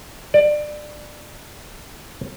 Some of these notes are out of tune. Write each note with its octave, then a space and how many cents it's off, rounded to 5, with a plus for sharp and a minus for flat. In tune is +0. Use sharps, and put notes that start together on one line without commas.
D5 +20